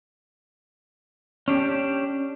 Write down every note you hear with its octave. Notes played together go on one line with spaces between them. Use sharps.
C#4 D4 G4